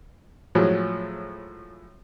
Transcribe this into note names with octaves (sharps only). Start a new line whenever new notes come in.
A2 F3 F#3 G#3